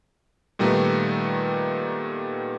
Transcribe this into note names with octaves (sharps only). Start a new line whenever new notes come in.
A#2 D#3 G3 A3 B3 D#4